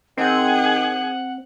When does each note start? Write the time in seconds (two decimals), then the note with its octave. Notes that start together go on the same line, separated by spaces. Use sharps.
0.18 D#3 C4 G#4 F#5